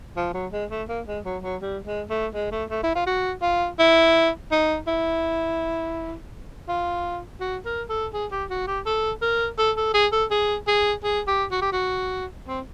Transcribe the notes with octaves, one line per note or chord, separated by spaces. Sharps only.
F3
F#3
G#3
A3
A#3
G#3
F#3
F#3
G3
G#3
A3
G#3
A3
A3
E4
F4
F#4
F4
E4
D#4
E4
F4
F#4
A#4
A4
G#4
G4
F#4
G4
A4
A#4
A4
A4
G#4
A4
G#4
G#4
G#4
G4
F#4
G4
F#4
C4